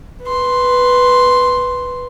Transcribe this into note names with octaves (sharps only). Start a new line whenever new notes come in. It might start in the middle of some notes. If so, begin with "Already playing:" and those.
B4 C6